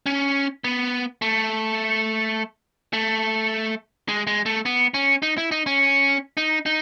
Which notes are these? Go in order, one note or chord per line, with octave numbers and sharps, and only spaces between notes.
C#4
B3
A3
A3
G#3
G#3
A3
B3
C#4
D#4
E4
D#4
C#4
D#4
D#4